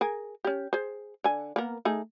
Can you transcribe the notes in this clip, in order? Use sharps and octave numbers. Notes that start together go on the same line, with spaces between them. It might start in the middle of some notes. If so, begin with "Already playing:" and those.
G#4 A#4 G#5
C#4 G4
G#4 C5
D3 G#5
A#3 B3 A#4
A3 D#4 G#4